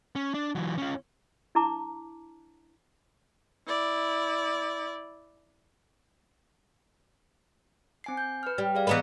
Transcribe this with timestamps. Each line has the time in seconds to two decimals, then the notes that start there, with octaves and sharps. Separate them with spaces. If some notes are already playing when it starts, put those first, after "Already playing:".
0.16 C#4
0.34 D4
0.55 E3 F#3
0.78 C#4 F4
1.55 D4 E4 A5 A#5 D6
3.67 E4 D5
8.04 C4 G#5 C7
8.17 G6
8.43 B4 F6
8.58 G3
8.75 G#4 D5 F5
8.87 E3 B3 B4 D#5 A#5 B6